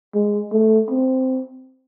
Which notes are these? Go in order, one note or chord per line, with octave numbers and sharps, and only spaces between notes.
G#3
A3
C4